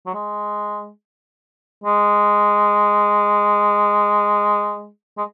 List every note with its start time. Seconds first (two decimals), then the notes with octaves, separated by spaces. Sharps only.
0.06 F#3
0.14 G#3
1.84 G#3
5.18 G#3